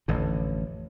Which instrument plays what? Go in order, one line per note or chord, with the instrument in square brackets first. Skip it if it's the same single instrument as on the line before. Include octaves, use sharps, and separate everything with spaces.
[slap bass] A1 F2 D3